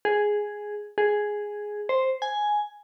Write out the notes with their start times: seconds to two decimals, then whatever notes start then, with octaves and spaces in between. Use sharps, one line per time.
0.05 G#4
0.98 G#4
1.89 C5
2.22 G#5